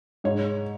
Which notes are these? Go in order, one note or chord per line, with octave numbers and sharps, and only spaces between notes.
G#2 C#5